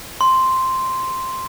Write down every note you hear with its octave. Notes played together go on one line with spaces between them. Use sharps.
C6